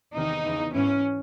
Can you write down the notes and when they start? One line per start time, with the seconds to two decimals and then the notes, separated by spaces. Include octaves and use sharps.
0.16 E2 C3 D#3 D#4
0.45 E2 C#3 E3
0.73 G#2 E3 C#4